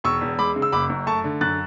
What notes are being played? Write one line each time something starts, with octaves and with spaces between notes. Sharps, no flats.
E1 C#6 E6
E2
G#3 B5 D6
C#3
E6
F#1 B5 D6
F#2
A3 A5 C#6
D3
F#2 F#6 A6